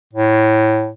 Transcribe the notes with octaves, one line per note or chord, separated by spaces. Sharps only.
A2